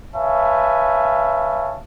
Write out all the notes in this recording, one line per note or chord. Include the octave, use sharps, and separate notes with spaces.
B4 C#5 E5 F5 G#5 A5